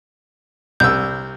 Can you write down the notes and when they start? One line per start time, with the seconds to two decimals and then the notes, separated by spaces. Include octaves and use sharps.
0.80 C2 E6 G6